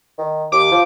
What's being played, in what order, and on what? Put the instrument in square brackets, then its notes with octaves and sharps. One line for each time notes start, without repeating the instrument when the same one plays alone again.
[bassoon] D#3
[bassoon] D#2 [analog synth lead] D6
[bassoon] F3